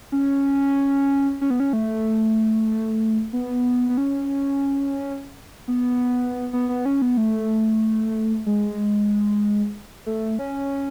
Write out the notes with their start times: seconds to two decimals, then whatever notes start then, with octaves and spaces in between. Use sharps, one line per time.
0.12 C#4
1.41 C#4
1.50 B3
1.60 C#4
1.73 A3
3.33 B3
3.89 B3
3.98 C#4
5.68 B3
6.53 B3
6.69 B3
6.85 C#4
7.02 B3
7.17 A3
8.46 G#3
10.06 A3
10.39 C#4